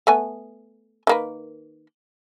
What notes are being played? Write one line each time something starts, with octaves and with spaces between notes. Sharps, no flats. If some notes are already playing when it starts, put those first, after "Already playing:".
A3 B3 G#5
D#3 A#3 B4